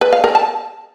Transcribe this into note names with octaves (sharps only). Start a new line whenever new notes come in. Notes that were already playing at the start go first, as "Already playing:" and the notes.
B4
F5
A#4
A5